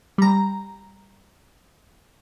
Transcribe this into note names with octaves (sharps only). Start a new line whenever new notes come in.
G3 A#5